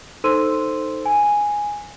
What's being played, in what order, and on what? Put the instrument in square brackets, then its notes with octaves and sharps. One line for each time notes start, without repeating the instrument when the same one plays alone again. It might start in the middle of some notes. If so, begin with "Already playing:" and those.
[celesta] D#4 A4 C5 C6 E6 D#7
G#5